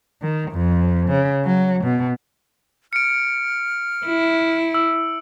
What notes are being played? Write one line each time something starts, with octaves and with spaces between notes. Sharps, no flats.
D#3
F2
C#3
F#3
B2
F6 C#7 D7
E4
E6